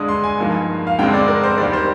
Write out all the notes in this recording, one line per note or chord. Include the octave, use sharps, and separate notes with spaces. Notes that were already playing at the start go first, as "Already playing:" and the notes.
Already playing: G2 D3 G#3 D4 D#6
C6
G#5
G2 F3 A#3 D#4
F5
G2 D3 G#3 C4 G5
D5
A#4
C5
D#2 D#3 G3 A#3 D5
C5